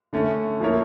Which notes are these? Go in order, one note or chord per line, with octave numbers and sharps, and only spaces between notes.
D3 A3 C#4
F3 A#3 E4 A#4 C#5